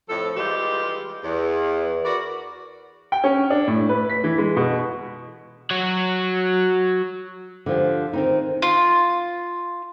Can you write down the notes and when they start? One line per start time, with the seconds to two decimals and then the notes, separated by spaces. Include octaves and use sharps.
0.09 F2 A2 F3 A4
0.36 E3 G3 G#3 F4 G4
1.24 E2
2.04 F#4 A#4 B4 D5
3.12 G5
3.24 C#4
3.50 D4
3.68 A2
3.89 B4
4.10 B6
4.24 E3
4.38 G#3
4.56 B2
5.70 F#3 F#4
7.66 D3 F3 G4
8.13 D#3 C4 D#4
8.62 F4